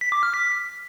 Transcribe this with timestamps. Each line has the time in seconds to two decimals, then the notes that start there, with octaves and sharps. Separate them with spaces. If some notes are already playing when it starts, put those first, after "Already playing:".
0.01 B6
0.12 D6
0.23 F6
0.34 B6